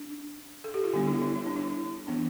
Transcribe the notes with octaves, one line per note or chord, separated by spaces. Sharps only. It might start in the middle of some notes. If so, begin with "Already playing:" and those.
Already playing: D4
A4
G4
F4
D3 G3 B3 D4 E4
E4
E4
E4
D4
E4
E3 B3 D4